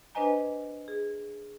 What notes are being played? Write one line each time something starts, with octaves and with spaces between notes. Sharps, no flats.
D4 B4 C5 D#5 G#5 A#5
G#4